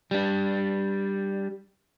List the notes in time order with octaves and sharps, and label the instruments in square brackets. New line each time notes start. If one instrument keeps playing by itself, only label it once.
[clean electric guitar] G3 D4